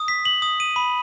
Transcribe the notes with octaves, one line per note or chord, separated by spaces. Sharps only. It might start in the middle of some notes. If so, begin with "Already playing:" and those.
Already playing: D#6
B6
F#7
D#6
D#7
B5